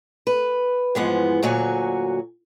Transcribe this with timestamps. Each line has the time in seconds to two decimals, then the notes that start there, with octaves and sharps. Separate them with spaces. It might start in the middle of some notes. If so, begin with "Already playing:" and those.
0.27 B4
0.95 G#2 E3 F3 G#3 B3
1.43 D2 A#2 F#3 F#4 C#5 G#5